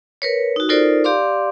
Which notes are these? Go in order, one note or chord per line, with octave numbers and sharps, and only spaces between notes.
A#4 B4 C#5
D#4 F#4
D#4 F4 A4 A#4 C5 D5
G4 D5 F5 C6 D6